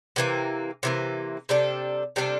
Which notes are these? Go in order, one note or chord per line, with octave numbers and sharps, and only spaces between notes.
C3 E3 A#3
C3 E3 A#3
C3 G3 D4 A4
C3 G3 D4 A4